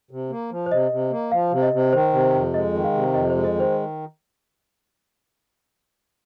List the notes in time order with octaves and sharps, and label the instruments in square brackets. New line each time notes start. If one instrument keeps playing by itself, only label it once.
[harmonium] C3
A#3
F3
[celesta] C5
[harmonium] C3 [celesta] D#5
[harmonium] C3
A#3
[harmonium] F3 [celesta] F5
[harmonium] C3
[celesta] D#5
[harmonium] C3
[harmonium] D#3 [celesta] C5
[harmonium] C3
[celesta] C5
[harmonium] F2
[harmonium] G#3 [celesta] D#5
[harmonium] D#3
[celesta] F5
[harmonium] C3
[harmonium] F2 [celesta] D#5
[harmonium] G#3 [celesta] C5
[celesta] D#5
[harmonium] D#3
[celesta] C5